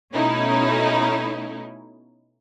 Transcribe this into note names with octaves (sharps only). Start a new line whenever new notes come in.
B2 A3 C#4 D#4 E4